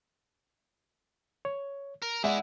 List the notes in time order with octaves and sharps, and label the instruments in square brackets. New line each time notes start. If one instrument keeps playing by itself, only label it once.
[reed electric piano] C#5
[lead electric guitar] A#4
[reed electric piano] G#3 D5 [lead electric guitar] E4 G#4 [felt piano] E5 F#5